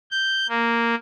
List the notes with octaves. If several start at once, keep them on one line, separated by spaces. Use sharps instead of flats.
G6
A#3